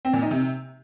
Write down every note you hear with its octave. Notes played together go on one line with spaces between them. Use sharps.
C4
A#2
D#4
C3